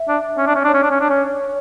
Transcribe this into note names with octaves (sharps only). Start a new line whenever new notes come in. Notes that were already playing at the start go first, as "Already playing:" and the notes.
Already playing: E5
D4
C#4
D4
C#4
D4 C#5
C#4
D4
C#4
D4
C#4